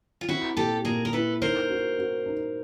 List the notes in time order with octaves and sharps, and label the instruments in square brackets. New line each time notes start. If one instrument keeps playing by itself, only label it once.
[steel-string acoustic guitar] F4
[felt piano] C4 [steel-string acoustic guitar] E4 F#4
[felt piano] A#2 [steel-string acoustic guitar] G4 A4
[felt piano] A#2 [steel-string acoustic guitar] G#4 A#4
[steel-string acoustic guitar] A#4
[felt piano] E4 [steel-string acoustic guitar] A4 B4
[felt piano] D#4 [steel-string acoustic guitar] A#4 C5
[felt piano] F#4
F#4
D#4